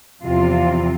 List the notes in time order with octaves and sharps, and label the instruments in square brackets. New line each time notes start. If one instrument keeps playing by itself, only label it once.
[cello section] E2 C3 F3 C4 F4